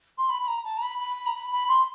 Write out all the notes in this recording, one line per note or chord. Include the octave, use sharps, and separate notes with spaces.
C6
B5
B5
A#5
A5
A#5
B5
B5
A#5
B5
B5
C6